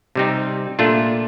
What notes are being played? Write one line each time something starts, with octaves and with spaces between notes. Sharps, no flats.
C3 G3 C4 D#4
A#2 A3 D4 F4